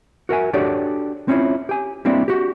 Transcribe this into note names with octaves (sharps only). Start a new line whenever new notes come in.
F#4 A#4 E5 G#5
D4 F#4 G4 A4 C#5 D5
C4 C#4 E4 F4 C#5
G4 G#5
G3 A#3 C4 D4 E4
F#4 G4